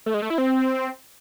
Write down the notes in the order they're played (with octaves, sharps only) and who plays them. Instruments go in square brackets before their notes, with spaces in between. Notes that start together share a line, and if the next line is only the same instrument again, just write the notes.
[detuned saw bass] A3
G#3
A3
E4
C4